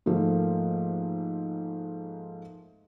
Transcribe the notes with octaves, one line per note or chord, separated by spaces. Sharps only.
G#2 F3 A3 A#3